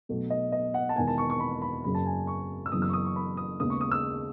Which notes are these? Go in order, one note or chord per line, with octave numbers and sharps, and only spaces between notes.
B1 B2 A3
D#5
D#5
F#5
A5
E1 E2 D#3 G#5
A5
C#6
C#6
B5
B5
F#1 F#2 C#3 B5
A5
G#5
C#6
E6
F#1 F#2 C#3 E3 B3 D#6
E6
C#6
D#6
C#6
B5
D#6
D#2 C#3 G#3 B3 D#6
C#6
D#6
E6